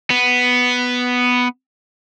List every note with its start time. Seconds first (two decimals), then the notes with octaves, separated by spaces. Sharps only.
0.10 B3